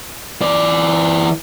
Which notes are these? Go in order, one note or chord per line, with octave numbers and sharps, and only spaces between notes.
E3 D5